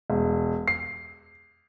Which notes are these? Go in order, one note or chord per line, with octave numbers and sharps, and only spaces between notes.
E1
C7